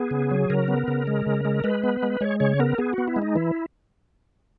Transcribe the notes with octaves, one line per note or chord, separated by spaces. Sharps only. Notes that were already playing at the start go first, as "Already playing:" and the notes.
Already playing: B3 G#4
C#3
F#3
C#3 A#4
B3
C#3
G#3
C#3
G#3
G#3 B4
B3
G#3
G#3 C#5
C#3 C#5
B3 A#4
B3 G#4
B3 F#4
E4
G#3
D#4
E3 E4